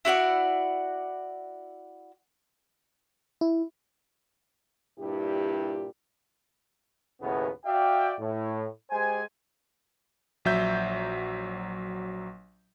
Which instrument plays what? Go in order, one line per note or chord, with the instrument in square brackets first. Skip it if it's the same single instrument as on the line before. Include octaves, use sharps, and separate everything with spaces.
[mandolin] E4 F#4 D5 F#5
[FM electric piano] E4
[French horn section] G2 A#2 E4 G4
[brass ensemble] D#2 A2 C#3 B3
F#4 D5 E5 F5 G5
A2
G#3 G4 C5 G#5
[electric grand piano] A#1 F#3 E5 G6